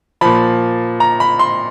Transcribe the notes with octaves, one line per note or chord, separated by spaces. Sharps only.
A#2 F3 B5
A#5
B5
C6